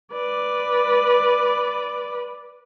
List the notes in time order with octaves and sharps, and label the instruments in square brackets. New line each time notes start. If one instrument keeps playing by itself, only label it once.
[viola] B4 D5